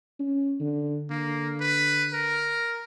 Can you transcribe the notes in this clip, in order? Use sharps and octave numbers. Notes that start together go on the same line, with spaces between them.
C#4
D3
D3 A#3
B4
A#4